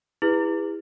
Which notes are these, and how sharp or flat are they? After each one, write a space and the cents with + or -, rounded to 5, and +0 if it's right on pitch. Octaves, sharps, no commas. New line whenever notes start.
E4 +0 G#4 -45 B4 +0